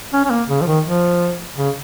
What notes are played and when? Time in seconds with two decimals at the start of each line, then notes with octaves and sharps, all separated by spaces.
0.13 C#4
0.25 C#4
0.30 A#3
0.48 C#3
0.61 F3
0.66 D#3
0.84 F3
1.57 C#3